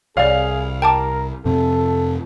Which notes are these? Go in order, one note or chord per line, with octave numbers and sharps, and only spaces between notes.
C2 G#4 C#5 D5 F5
A#4 G5 A5 D6
F2 C3 C4 A4